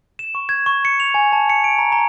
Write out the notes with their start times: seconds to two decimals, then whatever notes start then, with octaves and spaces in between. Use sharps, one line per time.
0.19 E7
0.35 C#6
0.49 G#6
0.66 C#6
0.85 C#7
1.00 F7
1.14 G#5
1.32 A5
1.49 C#7
1.64 D7
1.79 A#5
1.92 A#5